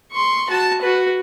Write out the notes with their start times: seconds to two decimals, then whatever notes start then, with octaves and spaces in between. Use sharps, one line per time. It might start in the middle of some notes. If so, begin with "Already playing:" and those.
0.12 C6 C#6
0.50 F#4 A5
0.81 F#4 B4